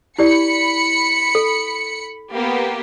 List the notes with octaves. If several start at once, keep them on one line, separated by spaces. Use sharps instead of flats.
E4 G4 D5 B5 C#7
A4
A#3 B3 G4